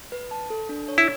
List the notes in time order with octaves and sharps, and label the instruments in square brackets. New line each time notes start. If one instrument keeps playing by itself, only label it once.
[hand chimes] B4
A5
A4
D4
C#5
[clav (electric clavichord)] E4